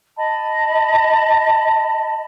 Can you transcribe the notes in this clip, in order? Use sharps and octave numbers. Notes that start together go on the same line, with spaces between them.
D#5 A5 B5